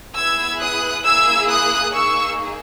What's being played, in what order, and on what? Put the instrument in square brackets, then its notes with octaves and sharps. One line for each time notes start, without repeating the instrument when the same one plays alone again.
[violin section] B3 E4 G#4 E6 G#6
D#6 F#6
A#3 E4 G#4 E6 G#6
D#6 F#6
A#3 D#4 G#4 C#6 E6